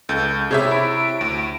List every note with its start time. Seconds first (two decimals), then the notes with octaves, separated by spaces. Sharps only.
0.09 C#2 A4 G6
0.51 C3 B3 G4 G#4 C#5 E5
0.71 E4 D7
1.21 D2